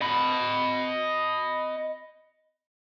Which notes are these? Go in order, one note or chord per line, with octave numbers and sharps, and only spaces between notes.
D#5 B5